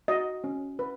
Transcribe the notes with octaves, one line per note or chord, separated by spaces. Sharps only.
F#4 D#5
C#4
B4